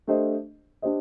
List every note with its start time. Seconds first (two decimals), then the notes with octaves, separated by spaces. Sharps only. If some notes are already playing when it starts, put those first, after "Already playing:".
0.07 A3 D4 G4 C5 D#5
0.82 D4 G4 C5 D#5